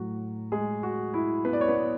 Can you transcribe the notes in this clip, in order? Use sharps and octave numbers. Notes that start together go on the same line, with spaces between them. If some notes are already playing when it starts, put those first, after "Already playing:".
Already playing: A2 F#3 F#4
G#3 G#4
F#4
E4
B3 B4
D5
C#5
B3 B4